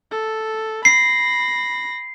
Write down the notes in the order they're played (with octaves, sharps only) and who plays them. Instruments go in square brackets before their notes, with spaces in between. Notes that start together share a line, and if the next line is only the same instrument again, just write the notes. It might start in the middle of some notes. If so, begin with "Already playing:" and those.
[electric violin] A4
[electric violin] B5 A#6 [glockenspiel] C7